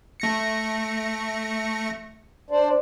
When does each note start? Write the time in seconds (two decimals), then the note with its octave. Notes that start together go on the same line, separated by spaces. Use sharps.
0.20 A3 A#6 C#7
2.51 D4 C5 D5